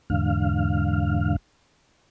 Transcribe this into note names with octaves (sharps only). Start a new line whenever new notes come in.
E2 G#2 D3 F5